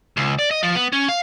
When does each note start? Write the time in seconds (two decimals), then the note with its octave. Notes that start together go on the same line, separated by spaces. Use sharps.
0.17 C#2
0.39 D5
0.51 D#5
0.63 F3
0.75 B3
0.93 C#4
1.08 F5